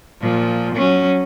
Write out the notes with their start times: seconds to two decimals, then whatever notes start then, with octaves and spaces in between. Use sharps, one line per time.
0.20 A#2 F3
0.74 F#3 C#4